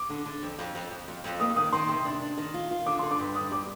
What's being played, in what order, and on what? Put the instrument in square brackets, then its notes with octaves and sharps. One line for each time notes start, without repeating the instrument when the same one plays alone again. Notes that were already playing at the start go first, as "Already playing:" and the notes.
Already playing: [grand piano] D6
[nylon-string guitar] D3
D3
F2
F2
F2
F2
F2
F2
[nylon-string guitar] A#3 [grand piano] D#6
[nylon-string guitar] D#3 [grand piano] D#6
[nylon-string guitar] D#3 [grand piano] C6
[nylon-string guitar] C3
D4
D4
D#3
F4
F4
[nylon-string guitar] D3 [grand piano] D6
[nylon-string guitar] D3 [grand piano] C6
[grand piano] D6
[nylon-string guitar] G2
[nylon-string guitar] D4 [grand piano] D#6
[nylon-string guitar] G3 [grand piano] D6